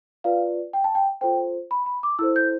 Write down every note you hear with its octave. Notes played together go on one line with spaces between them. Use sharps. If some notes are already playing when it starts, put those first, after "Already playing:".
F4 B4 D5 F5
G5
A5
G5
F4 A4 C5 G5
B5
B5
D6
E4 A4 C5 E6
G6